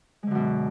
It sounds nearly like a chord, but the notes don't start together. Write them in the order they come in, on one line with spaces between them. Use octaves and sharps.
G#3 D3 F#2 B2